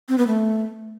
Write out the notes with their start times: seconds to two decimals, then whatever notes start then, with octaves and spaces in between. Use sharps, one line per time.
0.09 C4
0.18 B3
0.27 A3